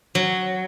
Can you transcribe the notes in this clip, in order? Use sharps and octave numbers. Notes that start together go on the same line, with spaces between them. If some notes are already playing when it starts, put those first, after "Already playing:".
F#3